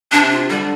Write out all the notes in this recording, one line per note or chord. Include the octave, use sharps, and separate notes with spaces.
C3 D4
F4
D3 G3